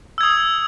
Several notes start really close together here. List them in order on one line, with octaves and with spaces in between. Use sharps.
E6 G#6 D#6